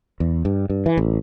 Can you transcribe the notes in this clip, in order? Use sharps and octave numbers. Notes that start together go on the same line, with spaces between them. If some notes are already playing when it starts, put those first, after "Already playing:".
E2
G2
G2
E3
A1